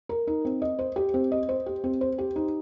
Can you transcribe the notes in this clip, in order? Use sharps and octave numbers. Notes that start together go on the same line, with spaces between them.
A#4
D#4
C4
D#5
C5
G4
C4
D#5
C5
G4
C4
C5
G4
D#4